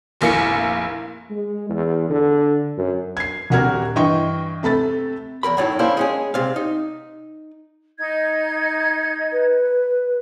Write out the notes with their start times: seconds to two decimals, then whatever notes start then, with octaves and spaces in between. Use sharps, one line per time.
0.21 F1 A#1 A#3 E4 C#7
1.30 G#3
1.69 E2
2.09 D3
2.78 F#2
3.17 G#6 C7
3.50 D#1 C2 F#4 G4 A#4 G#6
3.95 G2 E3 D#5 G5 C#6
4.63 C3 A3 B5 A6
5.43 E2 G2 A#4 B5
5.57 F#2 A2 F#3 D#4 E4
5.79 A#3 C#4 D4 E4 G4 C5
5.97 G#3 C#4 G#4
6.34 C2 C3 F5
6.56 D#4
7.99 D#4 D#5 G#6
9.33 B4